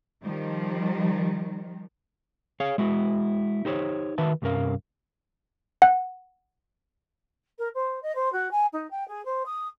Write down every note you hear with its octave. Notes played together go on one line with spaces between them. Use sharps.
D#3 F3 G3
G#4 C#5 F5
G#3 E4 F#4
D#4 G4 C5 C#5
D#3 F#4 B4 E5 A5
C2 G2 C#4 A#4 F5
F#5
A#4
C5
D#5
C5
F#4
G#5
D#4
G5
G#4
C5
D#6